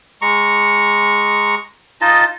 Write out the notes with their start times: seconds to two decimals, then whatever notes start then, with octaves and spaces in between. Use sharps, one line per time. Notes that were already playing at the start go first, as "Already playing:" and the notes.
0.22 G#3 A#5 C#6
2.01 D#4 F4 D#5 A5